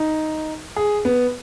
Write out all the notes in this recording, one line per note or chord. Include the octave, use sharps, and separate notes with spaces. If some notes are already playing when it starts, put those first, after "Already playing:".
Already playing: D#4
G#4
B3